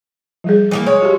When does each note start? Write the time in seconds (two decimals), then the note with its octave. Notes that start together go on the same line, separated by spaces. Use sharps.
0.44 F3 G3 G#4
0.71 E3 G#3 A#3
0.86 G#3 C#5 F5
1.02 F#4 G4